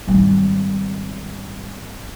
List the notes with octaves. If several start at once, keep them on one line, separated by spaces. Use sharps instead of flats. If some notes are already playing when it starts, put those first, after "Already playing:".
G#1 G3